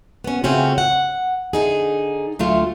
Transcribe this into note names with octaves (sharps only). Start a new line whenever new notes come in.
B3 C#4
C#3 A3 C4 C#4 F4 F#4
F#5
D3 D#4 G#4
D2 F#3 A3 F4